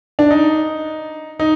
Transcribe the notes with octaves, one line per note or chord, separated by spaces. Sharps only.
D4
D#4
D#4